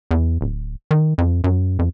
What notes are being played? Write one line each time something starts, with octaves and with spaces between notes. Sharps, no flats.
E2
D1
D#3
F2
F#2
F2